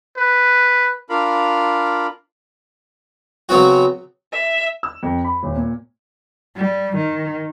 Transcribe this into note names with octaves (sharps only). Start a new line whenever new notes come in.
B4
D4 F4 A#4 F5 B5
C#3 F#3 B3 C4 F#4
E5
E6
F2
B5
D#1
A#2
G3
D#3